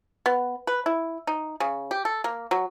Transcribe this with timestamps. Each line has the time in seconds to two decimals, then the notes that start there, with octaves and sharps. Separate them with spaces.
0.26 B3
0.67 B4
0.86 E4
1.27 D#4
1.60 C#3
1.91 G4
2.05 A4
2.24 A#3
2.51 F#3